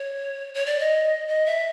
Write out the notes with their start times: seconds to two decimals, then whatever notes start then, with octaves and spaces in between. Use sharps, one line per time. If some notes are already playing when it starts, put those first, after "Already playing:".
Already playing: C#5
0.54 C#5
0.66 D5
0.79 D#5
1.28 D#5
1.46 E5